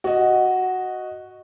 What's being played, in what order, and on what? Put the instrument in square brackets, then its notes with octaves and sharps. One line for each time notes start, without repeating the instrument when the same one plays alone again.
[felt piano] F#4 D#5